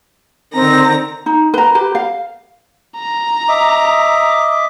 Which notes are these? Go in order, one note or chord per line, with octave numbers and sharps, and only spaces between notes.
D3 D#3 C4 A#5
D#4
B4 A#5
G4 B4
F5
A#5
D#5 E5 D6